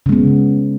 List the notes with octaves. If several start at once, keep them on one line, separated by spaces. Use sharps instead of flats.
C#3 G#3 B3